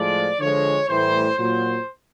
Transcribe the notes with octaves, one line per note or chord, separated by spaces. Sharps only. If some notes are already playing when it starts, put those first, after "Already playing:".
Already playing: A2 F3 G#3 D5
D3 F3 G#3 C#5
A2 E3 G3 C5
A#2 F#3 C5